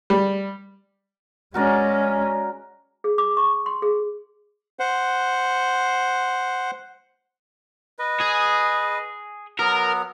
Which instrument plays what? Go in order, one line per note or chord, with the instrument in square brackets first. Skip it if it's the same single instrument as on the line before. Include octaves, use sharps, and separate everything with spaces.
[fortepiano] G3
[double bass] G#3 C#4 [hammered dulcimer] F#4 A#4 D5
[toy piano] G#4
D6
C#6
C6
G#4
[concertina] C5 F#5
[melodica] B4 D#5
[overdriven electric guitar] G#4
[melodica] F#3 B3 [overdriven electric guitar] A#4